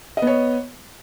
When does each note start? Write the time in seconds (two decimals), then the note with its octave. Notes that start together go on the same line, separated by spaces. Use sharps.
0.17 D#5
0.22 B3
0.27 C#5